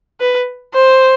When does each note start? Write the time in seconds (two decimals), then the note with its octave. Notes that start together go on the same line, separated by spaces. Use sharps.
0.20 B4
0.74 C5